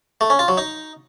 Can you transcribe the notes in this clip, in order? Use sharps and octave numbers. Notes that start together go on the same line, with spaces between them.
A3
C#4
F4
F#3
D#4